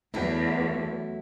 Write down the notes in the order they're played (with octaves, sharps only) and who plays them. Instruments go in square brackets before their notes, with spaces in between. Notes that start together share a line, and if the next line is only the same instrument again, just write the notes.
[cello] E2 [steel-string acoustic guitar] F#3 A3 E4